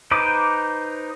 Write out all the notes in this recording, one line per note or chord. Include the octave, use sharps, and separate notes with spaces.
D#4 B4 C5 D6